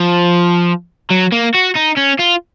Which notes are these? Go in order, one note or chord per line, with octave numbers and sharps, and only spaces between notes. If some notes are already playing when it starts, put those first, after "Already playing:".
Already playing: F3
F#3
A#3
F#4
D#4
C#4
F4